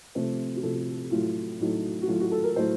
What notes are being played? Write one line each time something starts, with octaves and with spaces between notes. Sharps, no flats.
C3 F3 A3 C5
F#4
C3 F3 A3 A4
A2 F#3 A3 F4
A2 F#3 A3 D#4
F#4
A2 F#3 A3 F4
F#4
A4
A#4
A2 F#3 A3 C5